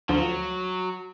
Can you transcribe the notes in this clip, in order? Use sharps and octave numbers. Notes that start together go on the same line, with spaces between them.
D2 F3 F#3